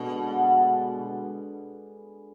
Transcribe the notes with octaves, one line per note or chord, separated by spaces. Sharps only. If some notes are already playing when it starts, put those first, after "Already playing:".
Already playing: B2 D3 G#3
D3 G#3 B3